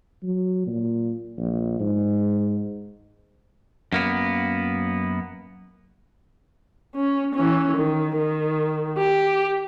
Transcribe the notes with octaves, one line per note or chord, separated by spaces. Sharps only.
F#3
A#2
A#1
G#2
F#2 A#3 B3
C#4
E3 C#4
D#3
D#3
G4